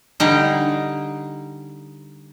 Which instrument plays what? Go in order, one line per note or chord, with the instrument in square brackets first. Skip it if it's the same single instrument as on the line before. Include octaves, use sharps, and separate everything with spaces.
[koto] D3 G3 D#4